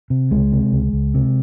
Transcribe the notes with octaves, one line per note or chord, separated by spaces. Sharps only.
C3
C#2 G#3
C3
C#2
C#2
C3